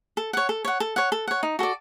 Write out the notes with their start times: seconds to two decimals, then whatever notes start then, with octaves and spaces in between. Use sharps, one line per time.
0.17 A4
0.33 C#5 F#5
0.49 A4
0.65 C#5 F#5
0.80 A4
0.96 C#5 F#5
1.12 A4
1.27 C#5 F#5
1.43 D#4
1.59 F#4 A4 D5